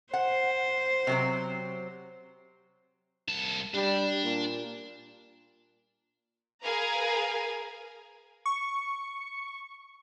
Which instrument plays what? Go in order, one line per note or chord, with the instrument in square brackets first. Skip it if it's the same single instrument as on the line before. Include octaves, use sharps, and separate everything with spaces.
[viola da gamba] C5 [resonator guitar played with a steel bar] F#5
[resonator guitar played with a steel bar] C3 F#3 C4
[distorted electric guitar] C2 A5
[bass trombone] G3 [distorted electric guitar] D4
[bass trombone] A#2
[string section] G#4 A#4 B4 F5 G#5 A#5
[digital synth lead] C#6